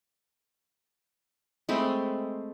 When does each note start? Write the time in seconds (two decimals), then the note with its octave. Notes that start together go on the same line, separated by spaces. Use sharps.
1.69 G#3 A3 C4 B5